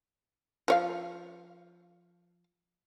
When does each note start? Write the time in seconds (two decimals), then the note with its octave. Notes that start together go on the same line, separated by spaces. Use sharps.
0.68 F3 C#5 F5